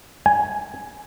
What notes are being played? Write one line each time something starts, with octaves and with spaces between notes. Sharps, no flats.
G#5